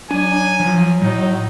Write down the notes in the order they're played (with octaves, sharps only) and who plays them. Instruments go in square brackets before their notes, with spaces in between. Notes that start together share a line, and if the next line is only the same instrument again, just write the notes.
[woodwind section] F#3 [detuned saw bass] D4 [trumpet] G#5
[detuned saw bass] F3
[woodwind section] A2 [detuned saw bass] F#3 [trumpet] D#4